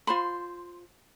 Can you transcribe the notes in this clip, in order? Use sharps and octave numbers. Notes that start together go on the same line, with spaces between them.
F4 C5 B5 C6